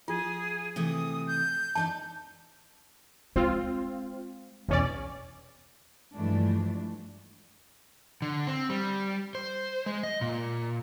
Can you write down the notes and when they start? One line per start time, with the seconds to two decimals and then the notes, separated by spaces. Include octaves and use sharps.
0.08 F3 F4 G#4
0.76 C3 E3 A3 D#6
1.27 G6
1.75 E3 D4 D#4 A5
3.36 G#3 C4 F4
4.69 B1 E2 C#4 D5
6.14 G2 E3 F3 G#3 A3 D4
8.22 D3
8.47 C4
8.70 G3
9.35 C5
9.86 G#3
10.03 D#5
10.21 A#2